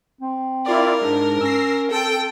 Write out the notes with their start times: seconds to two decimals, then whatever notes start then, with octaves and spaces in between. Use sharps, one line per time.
0.21 C4
0.66 E4 F4 A#4 D5
1.02 G#2 D4
1.41 C#4 E6 A#6 C7
1.91 C4 A4 G5